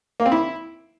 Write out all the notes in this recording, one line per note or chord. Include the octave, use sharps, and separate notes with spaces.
A#3
C4
E4